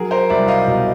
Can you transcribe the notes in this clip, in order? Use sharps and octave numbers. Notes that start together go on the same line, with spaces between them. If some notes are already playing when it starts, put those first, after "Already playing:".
Already playing: F#3 G#4 A#4
A#4 C5
C2 D5 E5
D#5 F5
B2